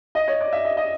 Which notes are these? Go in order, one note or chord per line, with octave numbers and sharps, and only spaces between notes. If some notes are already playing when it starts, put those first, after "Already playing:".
D#5
C#5
D5
E5
D#5
D#5